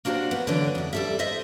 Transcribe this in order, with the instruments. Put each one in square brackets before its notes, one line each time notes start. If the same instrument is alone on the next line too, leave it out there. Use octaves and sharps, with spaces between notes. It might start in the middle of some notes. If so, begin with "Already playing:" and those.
[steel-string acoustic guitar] A#3 D4 F#4 G4 C5
B3
D3 E3 F#3 D4
F2 E4
G3 A4 E5
C5 D#5 E5